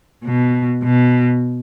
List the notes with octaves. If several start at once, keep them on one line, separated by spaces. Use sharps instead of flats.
B2
B2